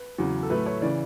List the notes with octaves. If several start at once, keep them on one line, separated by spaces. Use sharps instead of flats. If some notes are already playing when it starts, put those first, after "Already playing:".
Already playing: B4
E2 C#3 F#3
A4
A2 F#3 A3 B4
C#5
C#3 E3 D5